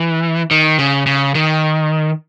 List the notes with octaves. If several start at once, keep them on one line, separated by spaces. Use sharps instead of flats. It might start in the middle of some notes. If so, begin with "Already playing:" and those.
Already playing: E3
D#3
C#3
C#3
D#3